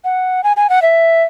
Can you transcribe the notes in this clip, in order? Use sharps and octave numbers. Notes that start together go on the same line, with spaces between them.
F#5
G#5
G#5
F#5
E5